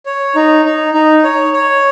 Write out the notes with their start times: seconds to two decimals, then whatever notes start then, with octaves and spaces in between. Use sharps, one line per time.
0.06 C#5
0.35 D#4
0.65 D#4
0.94 D#4
1.23 C#5
1.53 C#5